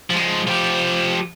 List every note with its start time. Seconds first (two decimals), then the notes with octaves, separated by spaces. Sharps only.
0.11 F3 G#3
0.48 F3 G4